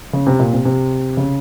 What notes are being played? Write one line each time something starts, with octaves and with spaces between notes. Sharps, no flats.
C#3
C3
A#2
C3
C3
C#3